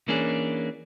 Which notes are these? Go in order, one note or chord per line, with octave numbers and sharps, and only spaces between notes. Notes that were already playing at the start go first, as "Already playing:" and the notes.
E3 A#3 C#4 D4 G#4